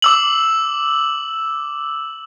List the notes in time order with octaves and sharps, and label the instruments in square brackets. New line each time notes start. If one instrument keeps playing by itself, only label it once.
[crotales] D6 E6 F#7